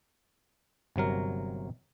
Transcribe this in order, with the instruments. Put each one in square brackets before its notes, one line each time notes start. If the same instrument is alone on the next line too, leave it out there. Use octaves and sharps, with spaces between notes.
[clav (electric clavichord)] G1 C3 F#3 A#4